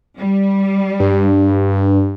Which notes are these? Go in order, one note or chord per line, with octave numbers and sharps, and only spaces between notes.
G3
G2